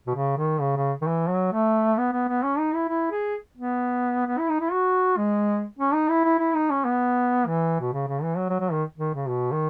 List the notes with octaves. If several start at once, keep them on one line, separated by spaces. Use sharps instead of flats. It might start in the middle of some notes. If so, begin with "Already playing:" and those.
B2
C#3
D#3
C#3
C#3
D#3
E3
F#3
A3
B3
B3
B3
C#4
D#4
E4
E4
G#4
B3
B3
E4
D#4
E4
F#4
G#3
C#4
D#4
E4
E4
E4
D#4
C#4
B3
E3
B2
C#3
C#3
E3
F#3
F#3
F#3
D#3
D#3
C#3
B2
D#3